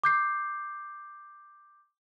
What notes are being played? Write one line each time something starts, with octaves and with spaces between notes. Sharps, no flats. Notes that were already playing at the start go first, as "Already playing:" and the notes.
D6 G6 C7